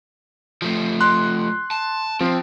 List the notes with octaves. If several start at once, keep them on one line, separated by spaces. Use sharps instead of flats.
F3 A3
C6 F#6
A5
F3 C4